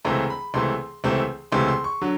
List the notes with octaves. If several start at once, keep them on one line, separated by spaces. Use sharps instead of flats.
C#2 C3 E3 A3 C4 A#5
B5
C#2 C3 E3 A3 C4 C6
C#2 C3 E3 A3 C4
C#2 C3 E3 A3 C4 C6
C6
C#6
D3 F#3